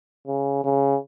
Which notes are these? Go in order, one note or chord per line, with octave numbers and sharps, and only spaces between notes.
C#3
C#3